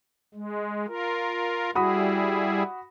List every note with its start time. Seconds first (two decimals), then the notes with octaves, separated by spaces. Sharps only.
0.34 G#3
0.88 F4 A#4
1.75 G3 E4 F#4 G#4 B5 D#6